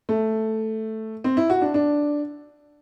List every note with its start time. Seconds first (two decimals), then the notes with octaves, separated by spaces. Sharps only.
0.09 A3
1.24 C4
1.37 E4
1.50 F#4
1.62 D4
1.74 D4